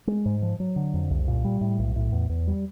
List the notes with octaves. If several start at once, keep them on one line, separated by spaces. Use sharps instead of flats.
G#3
G#2
F3
F#3
D3
F2
C2
A#2
G3
A2
B1
A2
E2
E2
G3